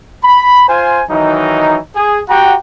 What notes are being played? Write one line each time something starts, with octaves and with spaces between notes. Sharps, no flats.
B5
F4 C5 G#5
D#3 E3 F#3 D#4
G#4
F#4 G4 F#5 G5 A#5